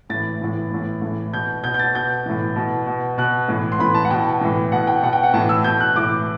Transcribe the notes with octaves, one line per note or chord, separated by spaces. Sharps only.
A2 E3 A6
A2 E3
A2 E3
A2 E3
B2 G6
B2 G6
G6
A6
B2 G6
A2 E3
B2
B2
B2 F#6
A2 E3
C6
A2 E3 B5
A5
F#5
B2 G5
A2 E3
B2 F#5
G5
B2 F#5
G5
F#5
A2 E3 A5
E6
B2 G6
F#6
A2 E3 D6